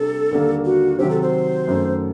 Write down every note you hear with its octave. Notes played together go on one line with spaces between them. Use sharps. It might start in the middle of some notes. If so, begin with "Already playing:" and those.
Already playing: C3 G3 D4 A4
D#2 D3 G3 A#3
F#4
C3 D#3 F#3 C4 G4
A4
C5
F#2 D#3 A3